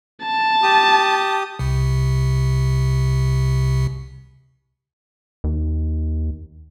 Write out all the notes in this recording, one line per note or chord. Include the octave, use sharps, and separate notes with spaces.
A5
G4 D#6
C2 C3
D#2